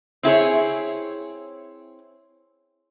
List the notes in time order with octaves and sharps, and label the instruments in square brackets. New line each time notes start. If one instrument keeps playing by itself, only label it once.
[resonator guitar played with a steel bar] C4 E4 G#4 C#5